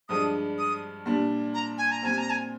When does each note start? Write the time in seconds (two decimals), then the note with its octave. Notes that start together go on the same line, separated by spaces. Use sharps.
0.09 G2 F3 G#3 D4 D#6
0.58 D#6
1.06 A#2 G3 D4
1.54 A#5
1.78 G#5
1.91 A#5
2.02 A#2 G3 C4 G#5
2.18 A#5
2.30 G#5